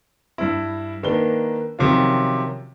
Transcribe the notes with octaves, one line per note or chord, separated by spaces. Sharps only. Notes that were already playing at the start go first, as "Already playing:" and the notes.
G2 E4
D#3 A#3 D4 B4 G7
C3 D#3 F3 F#3 C#4 F4